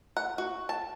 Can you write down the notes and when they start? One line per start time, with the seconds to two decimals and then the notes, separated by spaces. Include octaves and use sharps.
0.17 F#5
0.38 F#4
0.69 A5